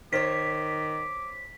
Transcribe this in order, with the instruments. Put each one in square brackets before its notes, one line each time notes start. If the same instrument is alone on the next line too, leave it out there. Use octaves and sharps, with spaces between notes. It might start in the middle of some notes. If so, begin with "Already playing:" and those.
[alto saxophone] D#3 [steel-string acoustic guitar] C5 C#5 [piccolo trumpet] D6 [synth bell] B6